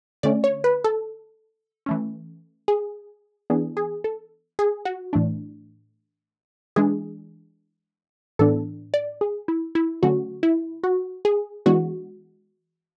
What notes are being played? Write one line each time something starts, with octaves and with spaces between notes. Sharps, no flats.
D3 A3 C#4 D5
C#5
B4
A4
E3 A3 C#4
G#4
E3 B3 D4 G#4
G#4
A4
G#4
F#4
A2 E3 A3 D4
E3 G#3 D4 G#4
A2 E3 B3 D4 A4
D5
G#4
E4
E4
D3 F#3 A3 C#4 F#4
E4
F#4
G#4
E3 G#3 B3 D4 F#4